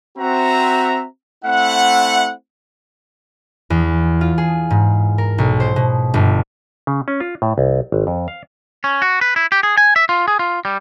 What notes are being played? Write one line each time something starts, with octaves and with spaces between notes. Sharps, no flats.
C4 F#4 E5 A#5
A3 C4 E4 E5 F#5
E2
F4
G#4
G#2
A#4
B1
C5
B2
G1
C#3
C#4
F4
A2
C2
G#1
F2
F5
C#4
F#4
B4
E4
G4
G#4
G#5
E5
F4
G#4
F4
G3